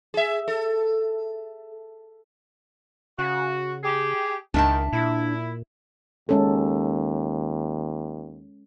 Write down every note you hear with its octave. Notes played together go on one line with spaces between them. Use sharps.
G#4 E5
A4
C#3 F#4
G4 G#4
C#2 D#3 D4 E5 A5
A#2 E4
D#2 G#3 C#4 A4